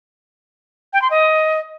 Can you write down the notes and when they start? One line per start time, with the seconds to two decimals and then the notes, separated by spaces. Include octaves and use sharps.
0.93 G5
1.02 C6
1.10 D#5